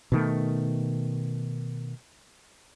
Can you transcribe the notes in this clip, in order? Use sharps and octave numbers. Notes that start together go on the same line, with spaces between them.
B2 D#3 A3